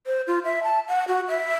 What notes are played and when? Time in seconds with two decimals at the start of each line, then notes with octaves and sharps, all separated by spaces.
0.07 C5
0.27 F4
0.44 E5
0.63 A5
0.88 F#5
1.08 F#4
1.28 E5